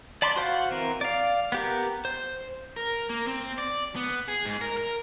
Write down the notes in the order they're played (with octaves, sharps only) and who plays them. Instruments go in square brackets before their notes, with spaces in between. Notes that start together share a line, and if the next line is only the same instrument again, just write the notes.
[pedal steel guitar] D5 A5 B5 C6 D6
F#4 C5 F5 F#5
E3 C4 A#4
D5 F5
B3 G4 A#4
C5
[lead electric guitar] A#4
A#3
C4
D5
B3
G#4
G#2
A#4
A#4